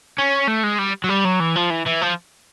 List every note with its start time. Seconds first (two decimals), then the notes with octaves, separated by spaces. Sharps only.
0.19 C#4
0.48 A3
0.64 G#3
0.79 G3
1.04 F#3
1.09 G3
1.25 F#3
1.40 E3
1.56 F3
1.70 E3
1.86 E3
2.01 F3